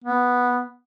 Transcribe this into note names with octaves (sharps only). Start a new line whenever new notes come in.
B3